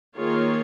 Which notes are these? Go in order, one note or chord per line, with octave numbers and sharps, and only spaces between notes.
D#3 A#3 F4 G#4 C#5